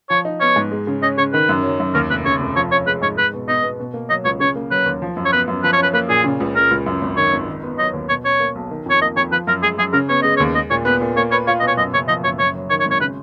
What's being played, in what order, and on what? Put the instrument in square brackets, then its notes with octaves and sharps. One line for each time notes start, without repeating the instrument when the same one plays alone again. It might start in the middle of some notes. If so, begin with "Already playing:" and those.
[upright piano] F3 [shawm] C#5
[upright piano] D#4
[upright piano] B3 [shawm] C#5
[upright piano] G#2
G#3
C#3
[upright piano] C#4 [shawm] D#5
[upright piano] C#3 [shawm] C#5
[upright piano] D#3 [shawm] B4
[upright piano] F#2
F#3
F#2
[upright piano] D#2 [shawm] A#4
[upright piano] F1 [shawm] B4
[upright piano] C#3 [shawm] C#5
[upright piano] F1
[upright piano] F3 [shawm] C#5
[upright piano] C#4 [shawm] C#5
[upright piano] G#3 [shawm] B4
[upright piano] G#2 [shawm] C#5
[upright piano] G#3 [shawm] B4
[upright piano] B2
[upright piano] B3 [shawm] D#5
[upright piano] B2
B2
A#3
[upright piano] F#3 [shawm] D#5
[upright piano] C#2 [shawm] C#5
[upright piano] C#3 [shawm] C#5
[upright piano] A#3
[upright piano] F#3 [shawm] B4
[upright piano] D#2
F3
F#2
[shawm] C#5
[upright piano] B3 [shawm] B4
[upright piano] F#2
[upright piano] F3 [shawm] B4
[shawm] C#5
[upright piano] C#4 [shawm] B4
[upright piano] A#3 [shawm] B4
[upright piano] A#2 [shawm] G#4
[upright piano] C#3
C#2
[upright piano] G#3 [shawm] A#4
[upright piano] C#2
F#2
G#1
[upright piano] D#3 [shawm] C#5
[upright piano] G#1
D#3
B3
[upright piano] F#3 [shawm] D#5
[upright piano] D#2
[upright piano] B2 [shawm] C#5
[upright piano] C#4 [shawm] C#5
[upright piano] A#3
B1
D#3
[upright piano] F2 [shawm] C#5
[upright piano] A#3 [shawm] D#5
[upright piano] F2 [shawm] C#5
[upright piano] F3 [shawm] B4
[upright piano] F#2 [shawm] A#4
[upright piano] G#3 [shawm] G#4
[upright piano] F#2 [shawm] G#4
[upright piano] C#3 [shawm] A#4
[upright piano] B3 [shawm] C#5
[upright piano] G#3 [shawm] D#5
[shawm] C#5
[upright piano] D#2
[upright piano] G#3 [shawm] D#5
[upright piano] A#2 [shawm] C#5
[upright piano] B3 [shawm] B4
[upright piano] A#2
[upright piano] A#3 [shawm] C#5
[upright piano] B4 [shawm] C#5
[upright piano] F4 [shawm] C#5
[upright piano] B2 [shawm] D#5
[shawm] C#5
[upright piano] F#2 [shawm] D#5
[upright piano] F#1 [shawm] C#5
[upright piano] F3 [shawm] D#5
[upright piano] F#1 [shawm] C#5
[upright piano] F#2 [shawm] C#5
[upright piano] F#3
[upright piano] D#3 [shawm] C#5
[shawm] C#5
[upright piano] G#1
[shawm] C#5
[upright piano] C#3 [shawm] B4